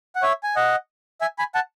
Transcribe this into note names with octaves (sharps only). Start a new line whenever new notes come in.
F#5
C#5 E5
G#5
D#5 F#5
E5 G#5
G#5 B5
F#5 A5